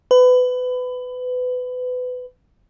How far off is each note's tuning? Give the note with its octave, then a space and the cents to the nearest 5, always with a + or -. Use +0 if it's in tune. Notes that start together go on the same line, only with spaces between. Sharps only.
B4 +25